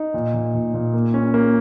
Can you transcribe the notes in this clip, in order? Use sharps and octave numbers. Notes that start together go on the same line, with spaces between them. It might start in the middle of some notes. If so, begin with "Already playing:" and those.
Already playing: D#4
A#2
A#2
A#2
A#2
A#3
C#4
A#3